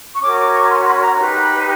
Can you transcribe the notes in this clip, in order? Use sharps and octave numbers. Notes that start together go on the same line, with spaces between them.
C#6
C#4 F#4 A#4 D6
D6
C#6
C6
C6
B5
A#5
D#4 G4 B4
B5